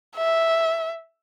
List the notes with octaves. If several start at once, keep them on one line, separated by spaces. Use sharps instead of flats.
E5